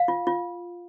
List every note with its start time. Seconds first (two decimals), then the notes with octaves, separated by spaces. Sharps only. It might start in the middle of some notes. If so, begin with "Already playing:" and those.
Already playing: F5
0.08 F4
0.27 F4